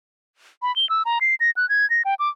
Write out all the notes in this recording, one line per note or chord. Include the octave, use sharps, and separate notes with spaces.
B5
G7
E6
A#5
C7
A#6
F#6
G#6
A#6
G5
D6